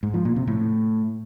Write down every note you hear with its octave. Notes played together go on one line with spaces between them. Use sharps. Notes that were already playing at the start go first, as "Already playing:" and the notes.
G#2
F3
A#2
C3
A2